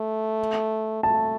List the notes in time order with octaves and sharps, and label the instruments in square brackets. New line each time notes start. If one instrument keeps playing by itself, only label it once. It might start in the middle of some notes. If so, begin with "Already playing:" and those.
Already playing: [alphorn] A3
[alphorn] A3 [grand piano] A5